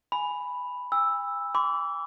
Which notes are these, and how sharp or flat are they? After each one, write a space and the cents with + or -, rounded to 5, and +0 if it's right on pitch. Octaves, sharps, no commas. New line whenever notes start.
G#5 +0 B5 +0
G#5 -45 E6 +0
B5 +40 D6 -30